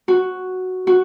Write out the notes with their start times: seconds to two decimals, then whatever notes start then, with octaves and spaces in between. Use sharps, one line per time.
0.08 F#4
0.87 F#4